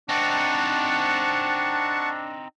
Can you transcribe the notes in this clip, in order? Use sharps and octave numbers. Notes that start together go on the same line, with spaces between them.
C4 D4 D#4 F#5 A5 C#6